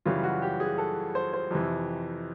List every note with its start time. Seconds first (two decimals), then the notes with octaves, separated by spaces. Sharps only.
0.06 F#2 C#3 E3 G3 F4
0.23 F#4
0.42 G4
0.60 G#4
0.78 A4
1.15 C5
1.33 C5
1.51 F2 C3 E3